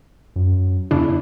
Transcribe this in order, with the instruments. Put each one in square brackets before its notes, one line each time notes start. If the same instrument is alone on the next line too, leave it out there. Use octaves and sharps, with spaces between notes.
[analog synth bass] F#2
[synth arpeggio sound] E2 C#3 D4 [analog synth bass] E4